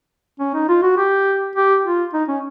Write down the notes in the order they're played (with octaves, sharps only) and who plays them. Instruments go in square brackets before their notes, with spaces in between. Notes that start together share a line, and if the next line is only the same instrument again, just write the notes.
[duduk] C#4
D#4
F4
F#4
G4
G4
F4
D#4
C#4